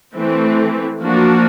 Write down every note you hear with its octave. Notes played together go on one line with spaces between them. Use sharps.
E3 A3 C4
F3 A#3 D4 F#4